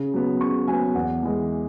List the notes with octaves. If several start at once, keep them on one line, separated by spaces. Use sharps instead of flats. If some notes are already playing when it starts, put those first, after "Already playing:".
Already playing: C#3
F#3 B3
C#3 C#6
F#3 B3 G#5
E2 F#5
E3 G#3